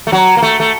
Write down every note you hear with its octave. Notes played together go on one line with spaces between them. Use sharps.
A3
F#3
A#3
A3
A3